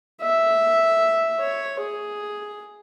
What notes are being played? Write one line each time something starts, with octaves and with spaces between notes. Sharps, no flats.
E5
C#5
G#4